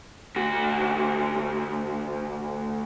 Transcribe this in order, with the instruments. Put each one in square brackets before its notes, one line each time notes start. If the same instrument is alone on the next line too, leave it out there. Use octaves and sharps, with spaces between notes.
[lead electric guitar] D2 F#4